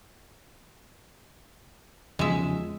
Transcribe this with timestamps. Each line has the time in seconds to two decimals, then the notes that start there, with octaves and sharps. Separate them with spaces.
2.19 E2 C#3 F3 G#3 E5